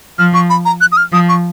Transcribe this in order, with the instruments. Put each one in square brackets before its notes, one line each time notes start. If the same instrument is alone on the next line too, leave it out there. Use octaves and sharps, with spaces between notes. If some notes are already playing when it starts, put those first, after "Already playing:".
[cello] F3 [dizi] F6
[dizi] C#6
B5
A#5
F#6
D#6
F6
[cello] F3 [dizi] D#6
[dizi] C#6